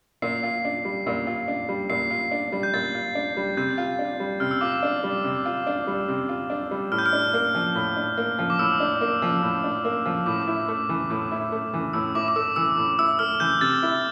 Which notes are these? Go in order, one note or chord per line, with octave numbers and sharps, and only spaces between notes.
A#2 C7
F4
D4
G3
A#2
F4
D4
G3
A#2 C7
F4
D4
G3
G6
A#2 A6
F4
D4
G3
C3 G6
F4
D4
G3
C3 F6
E6
F4 D6
E6
D4
G3
C3
F4
D4
G3
C3
F4
D4
G3
A2 F6
G6
F6
D4
A#3
F3
A2
D4
A#3
F3
D6
A2 E6
D4
A#3
F3
A2
D4
A#3
F3
A2 D6
E4
A3
E3
A2
E4
A3
E3
A2 E6
E4 D6
D6
A3 E6
E3 E6
A2
E4 E6
A3 F6
E3 G6
C3 A6
E4